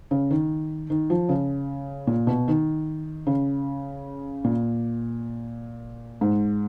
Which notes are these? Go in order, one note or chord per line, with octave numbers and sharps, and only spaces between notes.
C#3
D#3
D#3
F3
C#3
A#2
B2
D#3
C#3
A#2
G#2